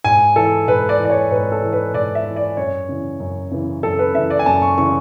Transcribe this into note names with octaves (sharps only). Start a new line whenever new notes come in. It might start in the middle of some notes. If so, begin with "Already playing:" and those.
G#2 G#5
E3 A4
G#2 B4
D5
E3
D5
C#5
G#2 B4
A4
E3
B4
G#2 D5
E5
E3
D5
F#2 C#5
C#3 E3
F#2
C#3 E3
F#2 A4
B4
C#3 E3 E5
D5
G#5
F#2 A5
C#6
C#3 E3 C#6